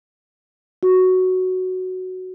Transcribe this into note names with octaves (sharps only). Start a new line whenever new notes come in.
F#4